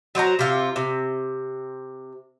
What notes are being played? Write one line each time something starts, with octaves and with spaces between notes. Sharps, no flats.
F#3 C5 D5 A#5
C3 F4
C3